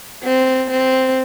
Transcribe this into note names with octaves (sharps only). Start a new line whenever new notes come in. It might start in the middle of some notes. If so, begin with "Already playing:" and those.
C4
C4